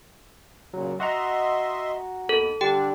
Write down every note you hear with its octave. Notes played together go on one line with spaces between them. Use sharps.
A#2 C#3 F#3
F#4 D#5 E5 F#5 A#5 C6
D#2 B3 A4
D3 G3 D4 G4 G5